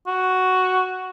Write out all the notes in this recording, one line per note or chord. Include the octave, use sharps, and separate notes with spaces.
F#4